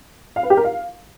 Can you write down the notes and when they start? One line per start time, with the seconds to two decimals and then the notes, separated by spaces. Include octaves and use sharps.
0.36 F5
0.43 B4
0.50 G4
0.57 A#4
0.64 F5